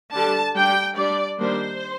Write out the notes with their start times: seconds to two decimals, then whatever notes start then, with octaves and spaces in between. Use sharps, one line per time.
0.13 D3 G3 D4 A5
0.55 G3 D4 G5
0.96 G3 D4 D5
1.38 D#3 G3 A#3 D4 C5